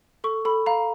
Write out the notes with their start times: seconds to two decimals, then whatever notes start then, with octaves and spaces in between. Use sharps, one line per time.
0.24 A4 C#6
0.45 A4 B5
0.66 F5 A#5